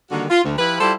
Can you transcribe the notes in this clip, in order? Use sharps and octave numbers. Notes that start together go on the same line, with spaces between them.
D3 D#3 G3 A#3 F#4
F4
D2
F3 E4 G4 B4
G3 E4 F4 G4 A4 C5